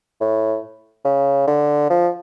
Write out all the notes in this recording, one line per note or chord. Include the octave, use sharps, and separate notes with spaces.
A2
C#3
D3
F3